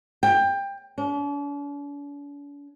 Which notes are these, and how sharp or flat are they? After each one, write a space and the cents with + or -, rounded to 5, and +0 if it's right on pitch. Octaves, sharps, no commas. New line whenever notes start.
G5 +20
D4 -45